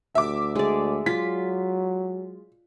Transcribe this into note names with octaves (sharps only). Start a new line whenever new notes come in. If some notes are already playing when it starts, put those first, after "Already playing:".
D2 E5 D6
G#3 D5
F#3 F4 B6